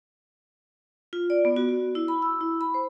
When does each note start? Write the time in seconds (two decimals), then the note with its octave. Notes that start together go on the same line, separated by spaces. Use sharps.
1.13 F4
1.30 D5
1.45 B3
1.56 F#4
1.69 F#4
1.95 E4
2.08 B5
2.22 E6
2.41 E4
2.61 B5
2.74 C5